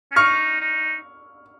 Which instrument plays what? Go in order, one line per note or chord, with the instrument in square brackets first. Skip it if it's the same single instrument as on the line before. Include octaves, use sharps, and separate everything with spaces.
[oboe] C#4
[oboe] D#4 [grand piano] C#6 F6
[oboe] D#4